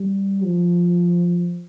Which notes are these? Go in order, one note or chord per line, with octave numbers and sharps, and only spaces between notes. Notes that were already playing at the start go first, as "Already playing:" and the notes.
Already playing: G3
F3